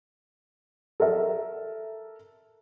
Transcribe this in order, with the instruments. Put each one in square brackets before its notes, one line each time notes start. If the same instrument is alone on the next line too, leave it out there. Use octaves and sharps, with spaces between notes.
[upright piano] A4 A#4 E5